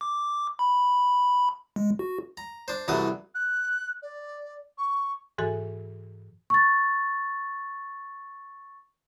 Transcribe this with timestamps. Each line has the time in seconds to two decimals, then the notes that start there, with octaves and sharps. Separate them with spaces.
0.01 D6
0.59 B5
1.76 G#3
1.99 F#4
2.37 A#5
2.68 D4 C5
2.88 C2 F#2 E3 F#3 A3 D#6
3.35 F#6
4.02 D5
4.78 C#6
5.38 G#2 E3 F#4 A4 G#5
6.50 C#6 A6